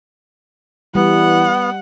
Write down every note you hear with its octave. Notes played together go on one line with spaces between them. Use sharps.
E3 G3 B3 F#5